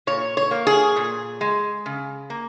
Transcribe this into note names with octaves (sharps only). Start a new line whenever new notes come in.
A#2 C#5
C#5
A#3
G#4
A#2
G#3
C#3
A#3